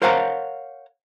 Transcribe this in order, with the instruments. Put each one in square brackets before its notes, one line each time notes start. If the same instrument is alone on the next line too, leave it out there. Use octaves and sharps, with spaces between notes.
[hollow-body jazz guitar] A#4 C5 C#5 F5 F#5 A#5